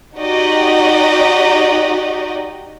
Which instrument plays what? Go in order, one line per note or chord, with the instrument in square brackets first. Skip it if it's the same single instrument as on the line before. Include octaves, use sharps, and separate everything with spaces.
[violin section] D#4 F#4 G4 D5 D#5